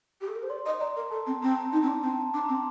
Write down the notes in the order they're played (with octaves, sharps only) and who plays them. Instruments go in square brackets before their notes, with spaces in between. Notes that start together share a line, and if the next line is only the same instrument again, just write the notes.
[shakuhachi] G4
A4
A#4
C5
[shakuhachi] D5 [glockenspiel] C6
[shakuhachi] D#5
[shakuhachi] D5 [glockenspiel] A#5
[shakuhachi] A#4
[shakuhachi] A4 [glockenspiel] A5
[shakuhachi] C4
[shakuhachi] C4 [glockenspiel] A#5
[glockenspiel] A5
A#5
[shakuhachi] D#4 [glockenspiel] A5
[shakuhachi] C4
D4
[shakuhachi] C4 [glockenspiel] A5
[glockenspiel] A#5
A5
[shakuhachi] D4 [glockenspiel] D6
[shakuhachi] C4 [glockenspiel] A#5
[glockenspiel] C6